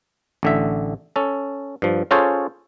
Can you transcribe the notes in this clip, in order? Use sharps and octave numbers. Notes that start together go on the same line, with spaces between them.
A1 D3 E5
C#4 A4
G2 F3
C#4 F4 G#4 A4 C5 C#5